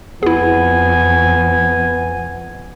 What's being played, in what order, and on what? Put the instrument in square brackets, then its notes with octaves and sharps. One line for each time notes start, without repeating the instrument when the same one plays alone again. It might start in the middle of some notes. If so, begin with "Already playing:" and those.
[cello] F2 [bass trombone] B3 [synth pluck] E4 G#4 [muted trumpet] G#5